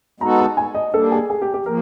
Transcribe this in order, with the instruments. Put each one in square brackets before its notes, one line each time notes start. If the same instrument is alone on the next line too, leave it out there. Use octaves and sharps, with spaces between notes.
[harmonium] G#3 B3 D#4 F#4 A4 [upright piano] A#5
[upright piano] A5
G#5
D#5
[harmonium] G3 A#3 D4 [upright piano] A4
[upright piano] G#4
G#4
G4
G4
[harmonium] F3 A#3 [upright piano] A#4